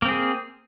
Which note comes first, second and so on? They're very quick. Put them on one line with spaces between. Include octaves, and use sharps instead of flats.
A#3 C4 G#4